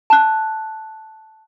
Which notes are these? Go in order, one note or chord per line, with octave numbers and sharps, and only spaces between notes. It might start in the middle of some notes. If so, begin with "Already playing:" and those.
A5 F#6